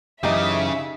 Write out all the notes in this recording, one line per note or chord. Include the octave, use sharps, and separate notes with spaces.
F#2 C#3 E3 D#4 G4 E5